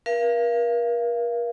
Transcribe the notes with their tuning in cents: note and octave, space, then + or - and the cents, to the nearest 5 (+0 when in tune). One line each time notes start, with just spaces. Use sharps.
A#4 +35 F5 -35